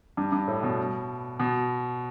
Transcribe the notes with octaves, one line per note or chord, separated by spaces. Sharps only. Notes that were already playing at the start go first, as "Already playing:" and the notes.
G2
G2
A2
B2
B2